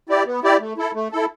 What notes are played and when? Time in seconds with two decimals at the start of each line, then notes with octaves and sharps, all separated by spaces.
0.09 E4 G4 D5
0.26 B3
0.43 E4 G4 D5
0.60 A3
0.78 E4 A4
0.94 A3
1.12 E4 A4